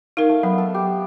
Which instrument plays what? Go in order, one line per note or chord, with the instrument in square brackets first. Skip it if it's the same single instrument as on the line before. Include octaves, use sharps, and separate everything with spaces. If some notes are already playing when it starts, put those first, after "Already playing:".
[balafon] D#4 A#4 [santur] F5
[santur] A3
[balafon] F#3 [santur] B3
[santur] A4
G4